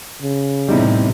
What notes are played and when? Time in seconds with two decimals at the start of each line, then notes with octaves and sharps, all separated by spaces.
0.22 C#3
0.69 E2 A2 C3 G3 D#4 E4